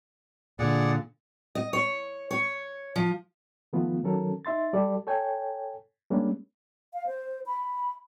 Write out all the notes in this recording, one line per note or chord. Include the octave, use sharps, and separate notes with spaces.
A#2 D3 G#4 D5 F#5
D#5
C#5
C#5
F3
D#3 F3 A3 B3 F4
D#3 F#3 C#4 A4 A#4
D#4 E5 C6 A6
G3 G4 A4 D5
A4 C#5 G5 G#5
G3 G#3 A#3 C#4 D4
F5
C5
B5